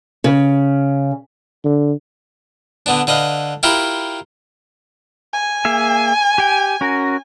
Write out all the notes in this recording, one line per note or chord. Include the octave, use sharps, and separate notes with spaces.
C#3
D3
D3 B3 D4
D3 B4 D#5 F5
E4 F4 G4 A#4 B5
G#5
A#3 G#4 E5
G4 G5
C#4 F#4 A#4